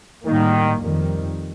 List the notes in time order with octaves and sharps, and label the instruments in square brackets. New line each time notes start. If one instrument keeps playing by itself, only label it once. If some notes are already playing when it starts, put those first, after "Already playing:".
[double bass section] A2 G3 A#3 [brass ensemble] D#3
[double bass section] F2 D#3 G3